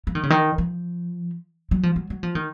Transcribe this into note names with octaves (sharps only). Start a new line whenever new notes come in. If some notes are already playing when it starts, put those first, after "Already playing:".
F3
D#3
C#3
D#3
F3
F#3
F3
F#3
F#3
F3
D#3